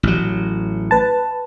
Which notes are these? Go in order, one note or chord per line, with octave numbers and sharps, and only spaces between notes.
A1 F#3
B4 A5